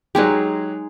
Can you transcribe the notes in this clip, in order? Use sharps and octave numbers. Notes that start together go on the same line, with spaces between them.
F#3 G#3 D#4 G4 G#4